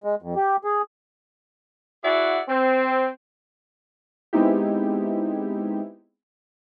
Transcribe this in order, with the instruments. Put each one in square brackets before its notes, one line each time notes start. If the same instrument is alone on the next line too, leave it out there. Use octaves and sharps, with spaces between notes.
[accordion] G#3
F2
G4
G#4
[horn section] E4 F#4 G#4 D5 E5 F#5
C4
[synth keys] G#3 B3 C4 D#4 E4 G4